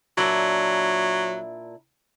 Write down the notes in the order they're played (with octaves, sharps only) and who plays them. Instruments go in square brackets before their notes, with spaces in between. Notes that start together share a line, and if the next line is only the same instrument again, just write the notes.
[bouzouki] A#2 D4 E4 [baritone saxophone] F#3